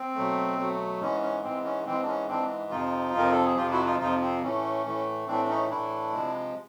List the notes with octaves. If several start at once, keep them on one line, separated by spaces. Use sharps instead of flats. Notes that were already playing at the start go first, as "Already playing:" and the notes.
Already playing: C4
B2 F#3 A3
B2 F#3 A3
G#2 E3 G#3 C#4
C#4
G#2 E3 G#3 C4
C#4
G#2 E3 G#3 C4
D4
C#4
G#2 E3 G#3 C4 D4
F2 C3 F3 D#4 F4
F2 C3 F3 A#4
A4
G#4
F2 C3 F3 F4 G4
E4 F#4
D#4 F4
F2 C3 F3 D#4 F4
C4
A2 E3 A3 C#4
A2 E3 A3
A2 E3 A3 C4 D4
D4
C#4 D#4
A2 E3 A3 D4 E4
C3 F3 G#3